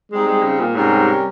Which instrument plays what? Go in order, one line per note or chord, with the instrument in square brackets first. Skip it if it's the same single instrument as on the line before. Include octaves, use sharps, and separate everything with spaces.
[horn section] G3 C4 D#4 [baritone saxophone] G#3
[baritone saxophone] G#3
C#3
A#2
[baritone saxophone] G#2 [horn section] C3 G3 C#4 G4 A#4